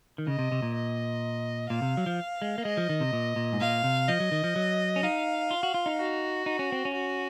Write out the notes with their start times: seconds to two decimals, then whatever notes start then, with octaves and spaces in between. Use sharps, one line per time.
0.18 D#3
0.27 C#3 D#5
0.39 C3
0.52 C3
0.62 A#2
0.75 D#5
1.70 A#2 F5
1.82 C3
1.97 F#3
2.06 F3
2.42 G#3
2.58 A#3
2.65 G#3 D#5
2.77 F3
2.89 D#3
3.00 C3
3.13 A#2
3.36 A#2
3.53 G#2
3.60 A#2 F5
3.84 C3
4.08 F3 D#5
4.20 F#3
4.32 D#3
4.44 F3
4.56 F#3
4.96 C#4
5.03 D#4 F5
5.51 F4
5.63 F#4
5.74 F4
5.86 D#4
5.98 F#4
6.46 D#4
6.59 C#4
6.72 C4
6.85 C#4
6.93 F#4